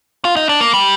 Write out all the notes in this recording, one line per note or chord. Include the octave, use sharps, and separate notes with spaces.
F4
D#4
D4
A#3
G3